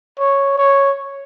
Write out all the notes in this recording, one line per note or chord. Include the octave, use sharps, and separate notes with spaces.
C#5
C#5